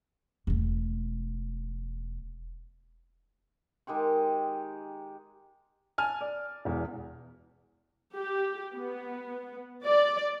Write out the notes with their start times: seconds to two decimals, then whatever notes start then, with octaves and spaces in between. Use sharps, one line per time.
0.47 E1 A3
3.87 D#3 G#3 G4 C#6
5.98 G#5 A5 F6
6.21 D5
6.65 E1 E2
8.13 G4
8.73 B3
9.84 D5